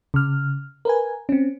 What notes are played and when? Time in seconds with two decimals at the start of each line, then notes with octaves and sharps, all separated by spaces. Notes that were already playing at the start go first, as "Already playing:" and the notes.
0.14 C#3 F6
0.85 A#4 B4 G#5
1.29 C4 C#4